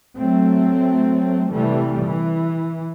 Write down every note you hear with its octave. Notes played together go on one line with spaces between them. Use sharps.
F#3 A3 C4
C3 E3 G3 A3
E3